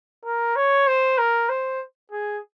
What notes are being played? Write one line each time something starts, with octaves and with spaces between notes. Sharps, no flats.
A#4
C#5
C5
A#4
C5
G#4